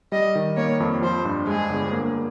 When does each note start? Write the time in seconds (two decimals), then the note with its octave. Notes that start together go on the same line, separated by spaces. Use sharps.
0.12 G3 D#5
0.35 D#3
0.57 A#3 C#5
0.80 F2
1.02 F3 C5
1.25 G2
1.47 G#3 G#4
1.70 G1
1.93 A#3